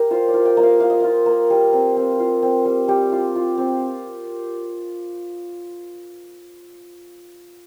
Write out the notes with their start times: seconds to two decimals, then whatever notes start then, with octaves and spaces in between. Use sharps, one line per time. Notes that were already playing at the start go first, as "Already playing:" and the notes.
Already playing: G4 A#4
0.11 F4 C5
0.28 D5
0.34 F4
0.45 G5
0.57 A#3 D#5
0.63 F5
0.80 F4 F5
0.90 D#5
1.00 F4 F5
1.26 A#3
1.50 G3
1.73 C4
1.97 C4
2.20 F4
2.42 C4
2.65 G3
2.88 G3 G4
3.12 F4
3.35 F4
3.58 C4